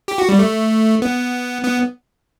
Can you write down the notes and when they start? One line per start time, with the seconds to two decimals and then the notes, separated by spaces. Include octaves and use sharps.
0.08 G4
0.18 F#4
0.29 G3
0.39 A3
1.02 B3
1.64 B3